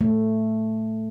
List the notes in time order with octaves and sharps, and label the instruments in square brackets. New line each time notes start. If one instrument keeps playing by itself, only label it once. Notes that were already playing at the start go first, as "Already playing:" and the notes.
[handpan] A3